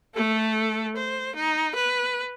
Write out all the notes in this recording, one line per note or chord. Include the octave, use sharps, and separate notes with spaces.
A3 A4
C5
D#4
B4